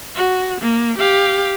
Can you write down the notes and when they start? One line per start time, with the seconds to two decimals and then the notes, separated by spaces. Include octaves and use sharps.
0.16 F#4
0.61 A#3
0.98 G4 F5